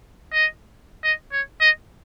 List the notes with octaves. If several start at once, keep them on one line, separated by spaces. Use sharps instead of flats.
D#5
D#5
C#5
D#5